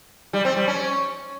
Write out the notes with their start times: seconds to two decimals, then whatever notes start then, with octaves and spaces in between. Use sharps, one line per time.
0.33 G3
0.45 C4
0.56 G3
0.68 C#4